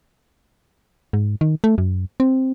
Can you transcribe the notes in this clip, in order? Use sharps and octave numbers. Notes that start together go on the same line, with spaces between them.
G#2
D#3
A3
F#2
C4